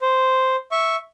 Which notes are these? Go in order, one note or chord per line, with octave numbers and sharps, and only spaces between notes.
C5
E5 C#6